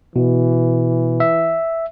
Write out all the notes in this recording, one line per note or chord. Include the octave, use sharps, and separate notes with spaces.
B2 E3
E5